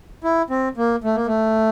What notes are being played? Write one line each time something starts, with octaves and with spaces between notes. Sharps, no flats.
E4
C4
A#3
A3
A#3
A3